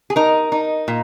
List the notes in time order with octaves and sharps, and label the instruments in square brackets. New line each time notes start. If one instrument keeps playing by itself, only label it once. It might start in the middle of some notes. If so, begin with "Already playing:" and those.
[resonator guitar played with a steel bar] G#4
D#4 A#4
D#4
A#2